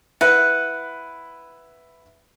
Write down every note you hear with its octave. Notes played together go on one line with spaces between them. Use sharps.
E4 B4 F#5